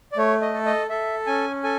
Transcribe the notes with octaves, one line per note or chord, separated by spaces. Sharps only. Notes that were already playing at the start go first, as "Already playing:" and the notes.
D5
A3 C#5
D#5
A4
D#5
A4 E5
C#4 G#5
A4 G#5